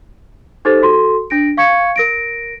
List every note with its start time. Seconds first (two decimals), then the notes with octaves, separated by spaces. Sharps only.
0.65 D#4 G4 A4 C5 A6
0.83 F#4 A4 C6
1.30 D4 A#6 D7
1.57 F5 C#6 G#6 C#7
1.96 A#4 A#6 D7